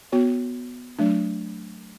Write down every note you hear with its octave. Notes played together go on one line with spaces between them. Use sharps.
B3 F#4 C#5
F#3 A3 D4